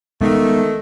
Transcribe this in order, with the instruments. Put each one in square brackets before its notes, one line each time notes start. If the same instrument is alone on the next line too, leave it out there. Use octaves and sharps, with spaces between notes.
[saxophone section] D#3 A3 [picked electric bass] G#3 B3